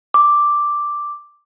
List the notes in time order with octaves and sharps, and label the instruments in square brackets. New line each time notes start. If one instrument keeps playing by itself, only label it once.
[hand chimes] D6